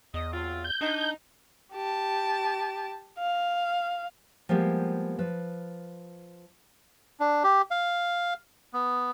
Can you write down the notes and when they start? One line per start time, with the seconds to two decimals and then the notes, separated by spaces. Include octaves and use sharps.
0.14 E2 D#5
0.32 F#3 C4 F4
0.64 G6
0.81 D4 D#4
1.73 G4 A5
3.19 F5
4.49 F3 G3 G#3 A#3 B3 G4
5.19 F3 B4
7.20 D4
7.44 G4
7.71 F5
8.74 B3